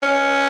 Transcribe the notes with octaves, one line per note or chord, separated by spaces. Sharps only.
C#4